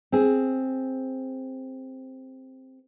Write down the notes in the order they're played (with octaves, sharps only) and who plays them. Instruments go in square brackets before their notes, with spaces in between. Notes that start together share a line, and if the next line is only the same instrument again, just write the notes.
[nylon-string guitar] C4 G#4